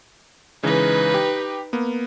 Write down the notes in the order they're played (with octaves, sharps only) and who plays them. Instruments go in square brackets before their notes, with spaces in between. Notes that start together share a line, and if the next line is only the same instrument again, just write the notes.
[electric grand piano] C#3 E3 G#3 [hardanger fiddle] D#4 B4
[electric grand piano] G4
A#3 B3